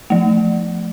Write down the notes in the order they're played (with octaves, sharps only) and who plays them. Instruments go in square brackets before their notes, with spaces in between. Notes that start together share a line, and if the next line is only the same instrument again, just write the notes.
[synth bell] F3 A3